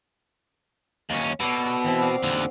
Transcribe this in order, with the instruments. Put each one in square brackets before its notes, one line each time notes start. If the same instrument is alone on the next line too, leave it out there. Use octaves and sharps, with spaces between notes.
[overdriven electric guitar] D#2 C#4
[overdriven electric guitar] B2 [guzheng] A4 C#5 D5
[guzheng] A4
E3 C4 E4
F#4 D5 F5
[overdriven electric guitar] D#2 D3